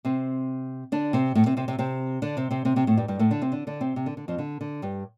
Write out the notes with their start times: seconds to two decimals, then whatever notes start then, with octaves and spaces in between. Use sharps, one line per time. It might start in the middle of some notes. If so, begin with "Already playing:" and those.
0.05 C3 C4
0.92 D3 D4
1.13 C3 C4
1.35 A2 A3
1.46 C3 C4
1.57 C3 C4
1.68 C3 C4
1.79 C3 C4
2.22 D3 D4
2.37 C3 C4
2.51 C3 C4
2.65 C3 C4
2.76 C3 C4
2.87 A2 A3
2.97 G2 G3
3.08 G2 G3
3.19 A2 A3
3.31 D3 D4
3.42 C3 C4
3.52 D3 D4
3.67 D3 D4
3.81 C3 C4
3.96 C3
4.06 D3
4.17 D3
4.28 F2 F3
4.38 D3
4.61 D3
4.82 G2 G3